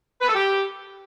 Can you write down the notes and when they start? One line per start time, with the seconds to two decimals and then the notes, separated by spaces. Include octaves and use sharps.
0.21 B4
0.28 A4
0.35 G4